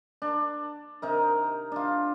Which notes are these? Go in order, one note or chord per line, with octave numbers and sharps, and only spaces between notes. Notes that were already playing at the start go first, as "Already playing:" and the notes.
D4
C3 D#4 A#4
D4 F4